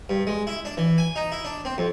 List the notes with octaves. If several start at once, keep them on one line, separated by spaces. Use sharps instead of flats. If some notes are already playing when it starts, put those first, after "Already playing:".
G2
G#3
E4
D4
E3
G#5
D#4
E4
D4
C4
F2